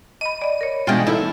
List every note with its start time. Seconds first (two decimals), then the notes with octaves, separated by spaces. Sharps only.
0.21 D#5 B5 D#7
0.42 D5 D#5
0.61 A#4 C#5
0.87 B2 E3 G#3 D4 F4 G5 F6 A6
1.07 A3 D#4 E4